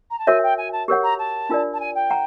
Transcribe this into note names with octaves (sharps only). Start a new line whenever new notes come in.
A#5
A5
F#4 A#4 C#5 E5 G#5
G5
G#5
A5
G4 A#4 C#5 F#5
A#5
A5
D4 F4 A#4 D5
A5
G#5
G5
F#5 A#5